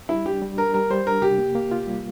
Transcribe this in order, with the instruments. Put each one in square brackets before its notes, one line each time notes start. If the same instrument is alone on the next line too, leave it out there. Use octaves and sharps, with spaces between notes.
[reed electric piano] G3 [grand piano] E4
[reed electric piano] D4 [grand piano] G4
[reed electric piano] G3
[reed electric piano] D4 [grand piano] A#4
[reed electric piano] G3 [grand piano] A#4
[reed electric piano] G3 [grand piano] C5
[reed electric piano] D4 [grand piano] A#4
[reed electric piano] C3 [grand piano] G4
[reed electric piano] A#3
A#3
F4
G3